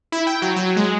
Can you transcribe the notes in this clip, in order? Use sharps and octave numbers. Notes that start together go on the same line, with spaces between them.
E4
G5
F#3
F#3
G#3